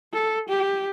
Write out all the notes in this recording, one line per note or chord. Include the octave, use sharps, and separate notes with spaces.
A4
G4